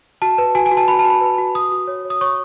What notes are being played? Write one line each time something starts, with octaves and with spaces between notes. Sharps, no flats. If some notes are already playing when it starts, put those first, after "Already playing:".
F#4 A5
B4
F#4 G#5
G#5
F#4
A5
F#4 B5
A5
F#4
B5
B4
F#4
F#4 D#6
F#4
C#5
C#5
D#6
C#5 C#6